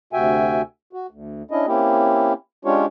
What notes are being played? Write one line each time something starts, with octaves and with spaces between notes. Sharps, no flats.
D2 C3 F#4 E5 G5 G#5
F#4
D2
C#4 D4 E4 D#5
A#3 C4 C#4 E4 G4
G#3 C#4 D4 F4 G4 C#5